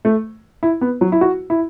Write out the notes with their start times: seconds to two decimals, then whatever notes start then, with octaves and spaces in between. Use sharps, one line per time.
0.05 A3
0.63 E4
0.81 B3
1.01 F#3
1.12 E4
1.21 F#4
1.50 E4